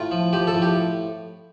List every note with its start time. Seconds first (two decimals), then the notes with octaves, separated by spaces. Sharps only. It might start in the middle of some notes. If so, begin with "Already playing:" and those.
Already playing: A2 F4
0.11 F3
0.33 F3 G4
0.47 A4
0.54 A2
0.62 G4